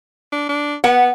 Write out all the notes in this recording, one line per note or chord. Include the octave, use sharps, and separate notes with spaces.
D4
D4
B3 F#5